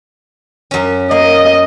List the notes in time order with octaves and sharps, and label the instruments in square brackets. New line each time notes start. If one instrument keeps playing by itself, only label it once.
[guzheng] F#2 C#4
[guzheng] A#3 [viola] D#5